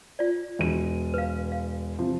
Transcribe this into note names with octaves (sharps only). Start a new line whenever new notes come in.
F4 D5
E1 D#7
B4 F5
F5
C3 F3